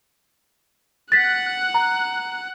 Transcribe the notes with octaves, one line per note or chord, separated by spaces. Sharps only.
F#5 F#6 A6 B6
A#5